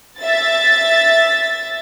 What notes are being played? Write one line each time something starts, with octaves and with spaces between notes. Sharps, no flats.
E5 A6